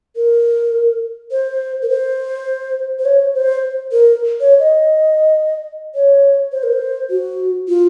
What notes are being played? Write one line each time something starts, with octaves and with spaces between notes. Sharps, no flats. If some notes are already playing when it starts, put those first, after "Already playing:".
A#4
C5
A#4
C5
C5
C#5
C5
A#4
C#5
D#5
C#5
C5
A#4
C5
F#4
F4